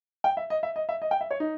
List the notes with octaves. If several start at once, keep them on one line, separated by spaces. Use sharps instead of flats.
G5
E5
D#5
E5
D#5
E5
D#5
G5
E5
C#5
D#4